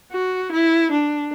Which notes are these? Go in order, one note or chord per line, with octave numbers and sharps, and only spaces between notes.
F#4
E4
D4